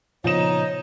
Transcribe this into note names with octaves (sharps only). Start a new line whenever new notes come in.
A#2 C#3 F3 B3 D#4 C#5 D#5 E7